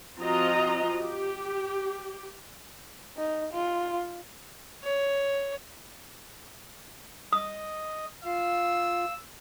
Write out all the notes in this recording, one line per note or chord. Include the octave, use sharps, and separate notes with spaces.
F3 C4 F4 F#4 D#5 A#5
G4
D#4
F4
C#5
D#5 D#6
F4 F5 E6